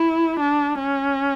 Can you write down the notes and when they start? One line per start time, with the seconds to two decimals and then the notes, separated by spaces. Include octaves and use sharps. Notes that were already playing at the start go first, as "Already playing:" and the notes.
Already playing: E4
0.40 D4
0.80 C#4